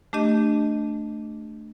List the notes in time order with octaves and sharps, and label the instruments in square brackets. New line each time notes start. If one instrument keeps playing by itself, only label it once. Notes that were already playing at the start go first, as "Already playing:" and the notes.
[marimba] A3 D4 G4 D#5